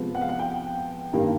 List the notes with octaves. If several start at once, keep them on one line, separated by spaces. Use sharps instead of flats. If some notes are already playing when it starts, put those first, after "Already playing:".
Already playing: C3 F3 G#3 B3
F#5
F5
F#5
G5
G2 D#3 G3 A#3